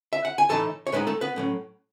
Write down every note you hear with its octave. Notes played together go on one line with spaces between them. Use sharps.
E5
F#5
G#5
A2 E3 A3 D#4 A4 A5
C#5
A2 G#3 B3 D#4 B4
A3 A4
B3 B4
A2 F#3 C#4